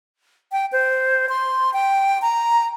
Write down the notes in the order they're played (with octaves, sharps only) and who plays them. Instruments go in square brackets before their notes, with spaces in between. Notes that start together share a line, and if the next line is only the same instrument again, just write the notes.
[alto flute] G5
C5
C6
G5
A#5